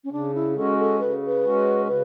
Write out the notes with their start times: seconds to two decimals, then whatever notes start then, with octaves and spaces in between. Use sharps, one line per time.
0.04 C#4
0.12 C#3 D4
0.35 E4
0.56 G#3 C#4 F#4 A4
0.78 A4
1.00 C#3 B4
1.27 B4
1.44 G#3 C#4 F#4
1.88 C#3 B4